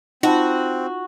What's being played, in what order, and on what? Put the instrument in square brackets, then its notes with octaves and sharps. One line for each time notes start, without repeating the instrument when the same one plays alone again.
[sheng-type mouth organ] C4 [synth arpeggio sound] D#4 [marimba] F4 A5 B5 [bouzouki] F#4